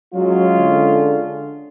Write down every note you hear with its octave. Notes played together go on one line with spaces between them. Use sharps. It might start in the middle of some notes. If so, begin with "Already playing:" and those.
F#3 G#3 C#4 F4
D3